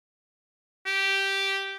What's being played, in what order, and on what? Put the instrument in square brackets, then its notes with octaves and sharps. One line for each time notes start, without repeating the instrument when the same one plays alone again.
[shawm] G4